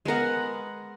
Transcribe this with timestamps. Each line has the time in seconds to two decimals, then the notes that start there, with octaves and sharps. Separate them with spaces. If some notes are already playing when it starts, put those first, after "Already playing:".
0.05 G#3 B3 A#4 F#5